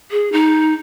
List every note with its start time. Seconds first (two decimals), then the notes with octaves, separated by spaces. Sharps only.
0.11 G#4
0.32 D#4